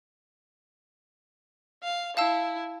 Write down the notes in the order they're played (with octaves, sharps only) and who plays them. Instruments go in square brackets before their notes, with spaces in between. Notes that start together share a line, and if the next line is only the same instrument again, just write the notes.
[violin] F5
[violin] E4 [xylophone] F5 A5 E6